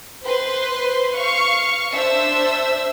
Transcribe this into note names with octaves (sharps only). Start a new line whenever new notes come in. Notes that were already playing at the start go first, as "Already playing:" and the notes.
B4 C5 C6
F5 C#6
D4 C5 E5 E6